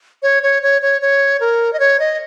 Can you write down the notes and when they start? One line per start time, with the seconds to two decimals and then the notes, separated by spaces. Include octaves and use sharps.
0.23 C#5
0.43 C#5
0.63 C#5
0.82 C#5
1.02 C#5
1.40 A#4
1.73 D#5
1.80 C#5
2.00 D#5